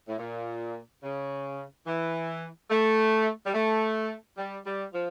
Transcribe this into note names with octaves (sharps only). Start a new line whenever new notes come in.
A2
A#2
C#3
E3
A3
G3
A3
G3
G3
F3